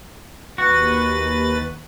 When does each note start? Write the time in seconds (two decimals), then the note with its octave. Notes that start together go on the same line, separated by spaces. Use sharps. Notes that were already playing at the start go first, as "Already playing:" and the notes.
0.58 D#2 F#4 B4 A6